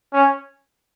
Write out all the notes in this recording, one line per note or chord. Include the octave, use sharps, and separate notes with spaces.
C#4